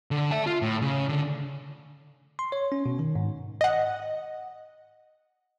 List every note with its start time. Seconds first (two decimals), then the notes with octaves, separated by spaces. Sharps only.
0.11 D3
0.31 E5 A5
0.47 F4
0.62 A2
0.81 C#3
1.09 D3
2.39 C6
2.52 C#5
2.72 C#4
2.86 B2
2.99 D#3
3.15 G#2
3.61 D#5 F#5